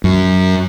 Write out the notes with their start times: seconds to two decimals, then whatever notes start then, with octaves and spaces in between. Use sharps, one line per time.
0.04 F#2